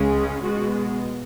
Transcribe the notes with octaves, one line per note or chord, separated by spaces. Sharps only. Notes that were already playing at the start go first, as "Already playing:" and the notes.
Already playing: C#2 C#3 G#3 C#4
B2 G#3 B3 F#4